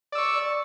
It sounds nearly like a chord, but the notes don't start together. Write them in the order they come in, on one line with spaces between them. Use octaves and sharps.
D5 E6 C#6